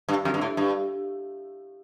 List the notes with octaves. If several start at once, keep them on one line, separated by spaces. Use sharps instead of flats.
G2
F2
G2
A2
G2